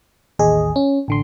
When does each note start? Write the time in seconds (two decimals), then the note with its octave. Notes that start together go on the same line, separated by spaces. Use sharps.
0.39 A1 D#2 G#4 D#5
0.76 C#4
1.08 A1 D3 C6